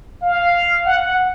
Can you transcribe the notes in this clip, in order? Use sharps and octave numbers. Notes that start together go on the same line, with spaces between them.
F5
F#5